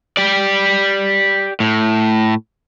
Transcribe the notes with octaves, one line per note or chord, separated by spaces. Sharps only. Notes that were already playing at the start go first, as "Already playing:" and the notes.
G4 D5
A2